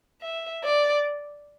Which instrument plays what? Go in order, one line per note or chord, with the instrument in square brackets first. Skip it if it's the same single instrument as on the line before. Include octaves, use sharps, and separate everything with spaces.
[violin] E5
D5